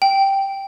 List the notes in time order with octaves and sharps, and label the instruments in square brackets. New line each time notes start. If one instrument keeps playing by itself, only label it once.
[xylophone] G5